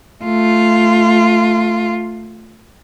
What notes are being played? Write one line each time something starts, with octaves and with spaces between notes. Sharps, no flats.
A3 F4